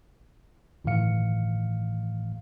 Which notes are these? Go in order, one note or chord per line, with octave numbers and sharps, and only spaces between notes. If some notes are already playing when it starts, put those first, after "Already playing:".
G1 A2 D#3 E3 F5 C#7